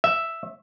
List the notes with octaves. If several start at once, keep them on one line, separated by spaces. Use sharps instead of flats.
E5